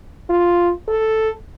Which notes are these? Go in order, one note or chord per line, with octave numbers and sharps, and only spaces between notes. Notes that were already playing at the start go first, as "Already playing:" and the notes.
F4
A4